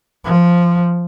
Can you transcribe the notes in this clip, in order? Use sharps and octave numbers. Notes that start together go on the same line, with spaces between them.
F3